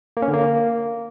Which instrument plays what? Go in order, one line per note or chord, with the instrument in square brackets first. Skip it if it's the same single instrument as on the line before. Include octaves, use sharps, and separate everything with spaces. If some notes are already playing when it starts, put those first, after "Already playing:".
[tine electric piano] A#3
C#4
D3
A#3